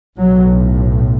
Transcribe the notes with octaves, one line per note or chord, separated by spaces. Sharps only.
B1 A2 F#3